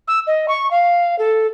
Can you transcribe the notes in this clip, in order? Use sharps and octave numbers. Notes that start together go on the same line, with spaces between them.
E6
D#5
C#6
F5
A4